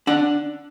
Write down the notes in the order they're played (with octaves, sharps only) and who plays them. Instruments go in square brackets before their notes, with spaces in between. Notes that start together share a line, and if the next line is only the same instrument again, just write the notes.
[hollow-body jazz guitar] D4 F#5